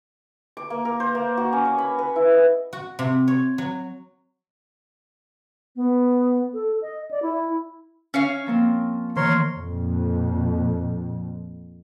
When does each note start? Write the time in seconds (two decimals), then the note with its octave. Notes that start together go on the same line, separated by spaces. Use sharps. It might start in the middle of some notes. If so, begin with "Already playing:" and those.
0.57 D6
0.70 A#3
0.85 A#4
1.00 C5
1.15 A#3
1.37 F#4
1.53 C#4
1.65 C#5
1.78 B5
1.98 B4
2.16 E4
2.31 D#5
2.73 F#4
2.99 C3
3.28 C#5
3.58 F#3
5.76 B3
6.54 A4
6.82 D#5
7.11 D5
7.22 E4
8.14 C#4 C#5 F5
8.46 F3 A#3 C4
9.17 D#3 E3 A#4 C#5 C6
9.55 F2 A#2